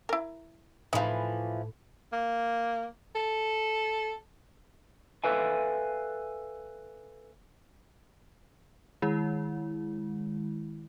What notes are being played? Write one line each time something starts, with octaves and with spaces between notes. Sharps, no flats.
E4 A#4
A2 E3 F3 D#4 F5 B5
A#3
A4
A4 B4 E5 F5 G#5
D#3 G#3 E4